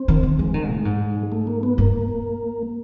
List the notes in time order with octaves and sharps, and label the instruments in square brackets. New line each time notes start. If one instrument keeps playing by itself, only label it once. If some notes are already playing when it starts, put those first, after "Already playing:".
Already playing: [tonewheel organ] C4
[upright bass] D#3
D#3
[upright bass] E3 [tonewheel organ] G#3
[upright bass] D#3
A2
G#2
[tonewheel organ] A3
A#3
B3
[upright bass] G2 [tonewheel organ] A#3